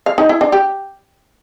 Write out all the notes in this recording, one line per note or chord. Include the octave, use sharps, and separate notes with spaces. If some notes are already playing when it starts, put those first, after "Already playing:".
F5
D#4
E4
D4
G4